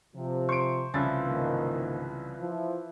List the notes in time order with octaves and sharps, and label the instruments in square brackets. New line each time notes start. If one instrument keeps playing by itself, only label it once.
[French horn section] C3 F3
[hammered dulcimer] C5 [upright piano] C#6 D7
[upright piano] C2 C#3 A6 [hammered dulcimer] E3 F3 E5
[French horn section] G#2 D#3 A#3
F3 E4